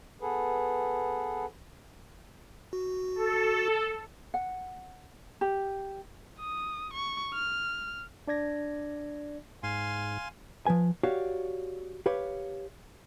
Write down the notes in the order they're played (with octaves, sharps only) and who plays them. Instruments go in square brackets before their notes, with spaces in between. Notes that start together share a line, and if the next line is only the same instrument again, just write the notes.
[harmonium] B3 G#4 A4 B4
[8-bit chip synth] F#4
[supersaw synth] A4
[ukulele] F#5
G4
[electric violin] D#6
C#6
F6
[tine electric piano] D4 D5 G#6 A#6
[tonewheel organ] G#2 [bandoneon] F5 G#5 C6
[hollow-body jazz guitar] F3 F#3 B4 G#5
F#4 G4 C#5 D5 F5
G4 B4 C#5 F5